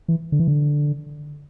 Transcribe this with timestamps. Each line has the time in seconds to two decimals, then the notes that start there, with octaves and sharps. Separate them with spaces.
0.08 E3
0.32 D3
0.40 E3
0.48 D3